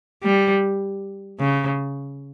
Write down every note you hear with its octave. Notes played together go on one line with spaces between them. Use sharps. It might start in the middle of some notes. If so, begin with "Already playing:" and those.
G3
C#3